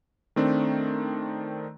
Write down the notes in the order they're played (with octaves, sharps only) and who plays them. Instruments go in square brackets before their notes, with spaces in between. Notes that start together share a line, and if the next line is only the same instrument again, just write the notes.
[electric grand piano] D#3 A3 C4 D4